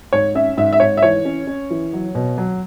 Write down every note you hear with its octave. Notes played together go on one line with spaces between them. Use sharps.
G#2 C#5
C#4 E5
G#2 E5
E5
G#2 C#5
E5
E3 C#5
C#4
C#4
E3
F#3
B2
F#3